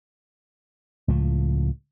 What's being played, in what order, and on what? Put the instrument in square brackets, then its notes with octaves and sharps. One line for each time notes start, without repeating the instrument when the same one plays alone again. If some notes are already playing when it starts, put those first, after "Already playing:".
[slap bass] C#2 A2 F3